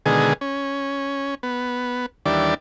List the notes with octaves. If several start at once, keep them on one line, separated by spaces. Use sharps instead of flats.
B2 D3 D#3 G#3 G#4
C#4
B3
D#2 E3 G3 D4 D5